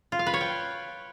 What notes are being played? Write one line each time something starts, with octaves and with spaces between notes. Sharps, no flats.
F4
F5
B4
C#5
G5